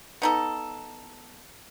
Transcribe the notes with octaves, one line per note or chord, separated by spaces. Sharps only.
B3 D#4 A4